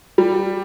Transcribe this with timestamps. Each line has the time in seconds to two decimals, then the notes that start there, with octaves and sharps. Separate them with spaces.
0.18 G3